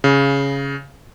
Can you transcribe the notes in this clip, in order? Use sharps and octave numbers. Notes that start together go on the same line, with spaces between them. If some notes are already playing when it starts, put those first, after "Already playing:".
C#3